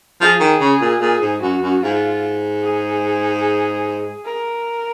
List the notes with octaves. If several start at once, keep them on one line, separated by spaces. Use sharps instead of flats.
F3 G#4
D#3
C#3
A#2
A#2 G#4
G#2
F#2 F#4
F#2
G#2 F4
G#4
A#4